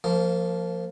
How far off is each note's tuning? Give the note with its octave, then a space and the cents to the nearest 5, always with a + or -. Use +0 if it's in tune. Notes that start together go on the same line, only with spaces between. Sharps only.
F3 +0 A#3 -25